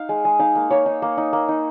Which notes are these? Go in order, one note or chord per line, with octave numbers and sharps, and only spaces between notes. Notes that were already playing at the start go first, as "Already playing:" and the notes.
Already playing: D#4 F5
G#3
G#3
D#4 F5
A#3
A#3 C#5
D#4
A#3
D#4
A#3
D#4